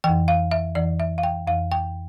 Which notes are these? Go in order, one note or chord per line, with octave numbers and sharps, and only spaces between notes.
F2 E3 G5
F5
E5
F2 E3 D5
E5
F5
G5
F2 E3 F5
G5